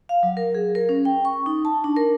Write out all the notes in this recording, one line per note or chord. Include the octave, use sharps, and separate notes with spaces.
F5
F#3
A#4
G#4
A#4
C#4
G5
C#6
D#4
A5
D4
A#4